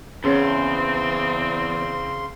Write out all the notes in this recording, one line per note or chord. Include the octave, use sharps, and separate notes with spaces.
E2 C#3 C4 C#4 G#4 C#5 C6